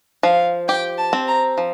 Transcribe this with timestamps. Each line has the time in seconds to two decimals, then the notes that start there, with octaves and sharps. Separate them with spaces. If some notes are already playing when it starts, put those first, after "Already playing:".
0.23 F3 F5
0.68 G4 G5
0.98 A5
1.13 C4
1.28 A#5
1.58 F3